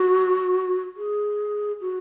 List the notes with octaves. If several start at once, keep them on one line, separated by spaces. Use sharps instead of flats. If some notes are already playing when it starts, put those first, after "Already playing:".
Already playing: F#4
G#4
F#4